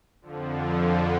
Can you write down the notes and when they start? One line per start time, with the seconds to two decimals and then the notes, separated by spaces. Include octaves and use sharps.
0.21 F2 D3 F3